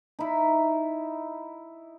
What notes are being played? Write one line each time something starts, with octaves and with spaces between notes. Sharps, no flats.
D#4 E4